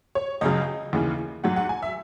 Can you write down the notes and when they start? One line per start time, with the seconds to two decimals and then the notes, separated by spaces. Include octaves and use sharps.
0.15 C#5
0.41 C#2 C#3 F#3 D#5
0.93 D#2 C#3 E3
1.44 G#2 F#3 F#5
1.56 F#5
1.69 G#5
1.82 E5